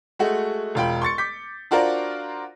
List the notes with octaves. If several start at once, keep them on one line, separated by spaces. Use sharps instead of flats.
G#3 A3 F#4
E1 F4 G5 B5
C6 C#6 A6 C#7
D6 G6 B6
D4 F4 F#4 A#4 C5 D5